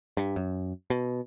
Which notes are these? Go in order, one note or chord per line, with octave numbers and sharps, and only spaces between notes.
G2
F#2
B2